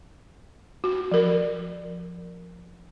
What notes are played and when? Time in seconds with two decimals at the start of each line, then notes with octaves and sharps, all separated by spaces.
0.84 F#4
1.12 F3 A#4